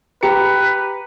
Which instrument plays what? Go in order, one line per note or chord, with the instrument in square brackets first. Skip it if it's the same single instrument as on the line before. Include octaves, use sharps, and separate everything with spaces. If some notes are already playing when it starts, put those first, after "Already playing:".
[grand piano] G4 A#5 C#7 [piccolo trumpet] B4